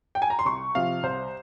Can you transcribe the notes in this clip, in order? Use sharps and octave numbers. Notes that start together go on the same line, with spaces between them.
G5
G#5
A#5
C6
C2 C#6
C3 F3 F5
C2 C5